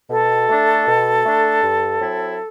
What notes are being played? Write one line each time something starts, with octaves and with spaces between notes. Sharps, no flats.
B2 A4
A3 D4
B2
A3 D4
G2
F#3 C4 E4